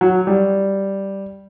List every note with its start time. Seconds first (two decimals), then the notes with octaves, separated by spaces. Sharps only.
0.01 F#3
0.27 G3